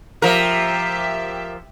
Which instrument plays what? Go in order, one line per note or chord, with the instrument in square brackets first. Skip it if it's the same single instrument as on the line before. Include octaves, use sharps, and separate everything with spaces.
[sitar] F3 A#4 [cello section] G4 E5